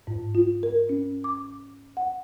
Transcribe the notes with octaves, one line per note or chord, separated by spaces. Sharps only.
G#2
F4
A#4
C#4
D6
F#5